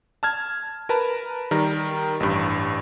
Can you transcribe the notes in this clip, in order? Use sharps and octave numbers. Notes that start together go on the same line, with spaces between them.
A5 F6 G#6
A#4 B4 A5 A#5
D#3 G3 A#4
A1 G2